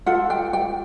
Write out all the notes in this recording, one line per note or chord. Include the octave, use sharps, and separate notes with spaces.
F4 A4 F#5
G5
G5